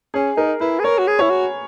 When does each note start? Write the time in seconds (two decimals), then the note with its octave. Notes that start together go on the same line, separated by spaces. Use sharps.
0.14 C#4 G#4
0.37 D#4 A#4
0.61 E4 B4
0.79 G#4
0.84 A#4 C#5
0.98 F#4
1.07 G#4
1.19 E4 C#5
1.30 F#4